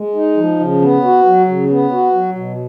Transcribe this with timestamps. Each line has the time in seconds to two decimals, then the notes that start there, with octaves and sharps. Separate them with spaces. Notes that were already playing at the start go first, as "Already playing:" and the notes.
Already playing: G#3
0.15 D#4
0.37 F3
0.60 C#3
0.81 B3
1.04 F#4
1.26 F#3
1.48 C#3
1.70 B3
1.92 F#4
2.14 F#3
2.36 B2